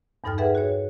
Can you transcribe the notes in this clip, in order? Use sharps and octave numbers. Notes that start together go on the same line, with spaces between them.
E2 G2 D#4 A4 G5 F6
G#4 A4 B4 E5 F#5
F#4 G#4 C#5